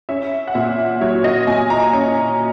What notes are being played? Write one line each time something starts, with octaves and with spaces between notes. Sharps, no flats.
C#4 E5
F#5
A#2 E5
F#3 C#5
D#5
A#2 G#5
A#5
C#4